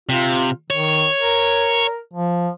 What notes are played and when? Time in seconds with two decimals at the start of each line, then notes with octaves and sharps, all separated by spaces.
0.09 C3 F4
0.70 D#3 C#5
1.19 A#4
2.13 F3